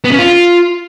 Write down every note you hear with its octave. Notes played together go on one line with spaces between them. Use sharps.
B3
C#4
F4